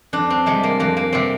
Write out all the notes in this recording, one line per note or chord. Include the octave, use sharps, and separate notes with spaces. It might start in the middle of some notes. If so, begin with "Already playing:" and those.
F2 D4
C4
C3 G3 G#3
A#3
F2 A#3
A#3
C3 G3 C4